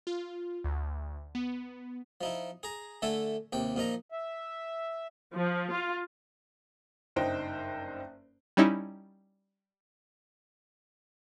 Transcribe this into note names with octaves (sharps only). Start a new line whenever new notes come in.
F4
D2
B3
F3 D#4 E4
G#4 A#5
D3 A3 A4 E5 G#5
D#2 C3 G5
A#2 F3 D#4 A#5
E5
F3
F4
F#1 G2 D#4 C5 G5
G3 C#4 D#4 E4